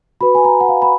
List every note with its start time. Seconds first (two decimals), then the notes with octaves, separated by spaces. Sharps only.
0.21 F#4 B4 B5
0.35 G#5
0.45 A#5
0.60 F#5
0.68 F5
0.82 B5